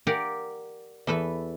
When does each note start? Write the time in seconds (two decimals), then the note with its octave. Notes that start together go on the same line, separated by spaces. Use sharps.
0.07 G4 A#4 D5 F5 F#5 G#5
1.07 E2 A4 B4 E5